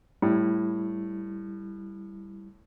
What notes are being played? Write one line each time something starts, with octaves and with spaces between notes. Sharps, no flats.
A2 G3 E4